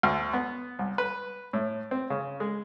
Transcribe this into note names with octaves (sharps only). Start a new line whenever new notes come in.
D2
B3
C2
B4
A2
C4
C#3
G#3